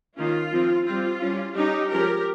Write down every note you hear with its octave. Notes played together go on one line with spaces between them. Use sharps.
D#3 A#3 C#4 F4
F3 C4
G3 C4 F4
G3 C#4
G3 C#4 D#4 G4
F3 G#3 C#4 G4 A#4